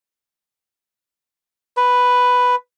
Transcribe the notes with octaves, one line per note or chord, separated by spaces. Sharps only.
B4